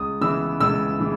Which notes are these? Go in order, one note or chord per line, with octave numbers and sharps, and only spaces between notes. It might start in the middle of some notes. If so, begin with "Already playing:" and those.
Already playing: C#2 D#6
C#3 E3 B3 E6
C#2 E6
C#3 E3